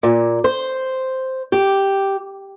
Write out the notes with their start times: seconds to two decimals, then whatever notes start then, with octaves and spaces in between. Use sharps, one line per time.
0.03 A#2
0.44 C5
1.52 G4